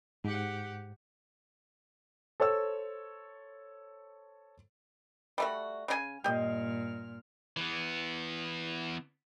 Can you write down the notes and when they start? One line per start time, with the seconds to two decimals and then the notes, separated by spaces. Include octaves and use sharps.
0.25 G#2 G4 F#5
2.40 A4 C5 C#5 E6
5.38 G3 A3 F#4
5.88 C#3 D4 G#5
6.24 G2 A#2 G4 D#5 F6
7.57 E3 B3